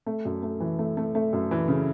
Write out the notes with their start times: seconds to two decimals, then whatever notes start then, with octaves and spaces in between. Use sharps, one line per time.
0.06 A3
0.25 F#2
0.43 A3
0.60 E3
0.79 A3
0.97 A3
1.15 A3
1.33 F#2
1.51 E3
1.68 C#3